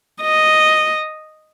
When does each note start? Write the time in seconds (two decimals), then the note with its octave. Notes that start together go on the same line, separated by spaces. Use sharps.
0.22 D#5